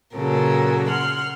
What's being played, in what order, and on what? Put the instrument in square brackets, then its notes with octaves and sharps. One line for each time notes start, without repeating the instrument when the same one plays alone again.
[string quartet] A#2 C#3 F#3 A4 A#4
F#5 C6 F6